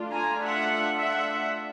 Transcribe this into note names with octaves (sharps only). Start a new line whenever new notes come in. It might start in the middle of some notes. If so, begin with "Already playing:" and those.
Already playing: A3 D4 F4
G#5 A#5
E5 F#5
E5 F#5